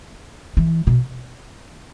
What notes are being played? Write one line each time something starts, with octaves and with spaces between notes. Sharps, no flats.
E3
B2